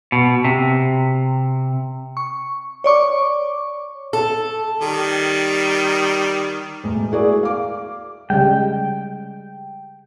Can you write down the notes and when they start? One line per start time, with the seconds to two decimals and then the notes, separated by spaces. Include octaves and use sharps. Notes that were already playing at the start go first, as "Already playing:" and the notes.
0.12 B2
0.45 C3
2.17 C#6
2.84 C#5 D5 C#6 D6
4.13 A4
4.81 D#3 G3
6.84 E1 A2
7.12 E4 F#4 G#4 A#4 D5
7.43 F5 D6
8.30 C#3 G3 G#3 G5